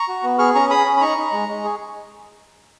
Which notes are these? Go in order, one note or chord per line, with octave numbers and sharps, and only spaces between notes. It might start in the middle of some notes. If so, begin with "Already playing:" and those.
Already playing: A#5 C#6
F#4
B3
G#4 C#6 F6
C#4 A#5 C#6
G#4 B5 D#6
C#4
B5
D#4 A#5 C#6
D#4
G#3
G#3
G#4